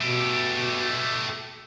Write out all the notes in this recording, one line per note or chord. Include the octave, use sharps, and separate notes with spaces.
B2 A3 G4